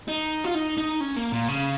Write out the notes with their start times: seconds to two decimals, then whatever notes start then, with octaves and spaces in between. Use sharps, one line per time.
0.08 D#4
0.45 F4
0.55 D#4
0.78 D#4
1.01 C#4
1.16 A#3
1.32 A#2
1.48 C#3